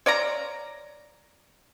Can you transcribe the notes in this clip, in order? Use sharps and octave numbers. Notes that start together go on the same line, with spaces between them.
C#5 D5 F5 A#5